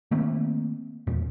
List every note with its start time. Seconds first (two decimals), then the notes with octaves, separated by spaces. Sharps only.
0.11 D#3 A3 A#3 C4
1.07 E2 A#2